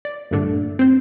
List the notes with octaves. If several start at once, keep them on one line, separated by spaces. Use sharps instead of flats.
D5
A#1 G2 D3 A3 D4
C4 C5